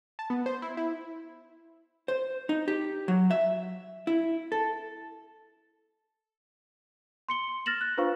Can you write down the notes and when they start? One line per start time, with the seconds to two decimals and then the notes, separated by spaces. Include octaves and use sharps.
0.19 A5
0.30 B3
0.46 C5
0.62 E4
0.77 E4
2.08 C5
2.49 D#4
2.68 G4
3.08 F#3
3.31 E5
4.07 E4
4.52 A4
7.29 C6 C#7 G7
7.66 F6 A6 A#6 E7 F#7
7.81 F#6
7.97 D4 F4 B4 C5 F5 C#6